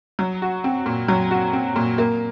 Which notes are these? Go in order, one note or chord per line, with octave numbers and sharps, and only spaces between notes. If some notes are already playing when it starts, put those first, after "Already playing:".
F#3
F#4
C4
A#2
F#3
F#4
C4
A#2
A#3